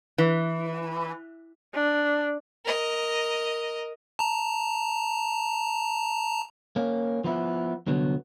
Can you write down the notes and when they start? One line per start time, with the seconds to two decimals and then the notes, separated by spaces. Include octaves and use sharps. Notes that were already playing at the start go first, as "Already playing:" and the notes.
0.18 E3
1.74 D4
2.65 A#4 D#5
4.19 A5 A#5
6.76 A#3 C#4
7.24 F3 B3 E4
7.87 C2 D3 F#3 B3